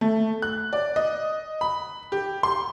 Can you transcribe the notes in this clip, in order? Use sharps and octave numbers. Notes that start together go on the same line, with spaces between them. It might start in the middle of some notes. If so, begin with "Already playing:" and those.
A3
F#6
D5
D#5
B5
G4
C6